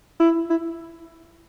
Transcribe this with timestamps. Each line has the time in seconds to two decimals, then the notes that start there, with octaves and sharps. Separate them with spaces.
0.20 E4
0.50 E4